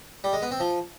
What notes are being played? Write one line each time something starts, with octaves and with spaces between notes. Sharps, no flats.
G3
G#3
B3
C4
F3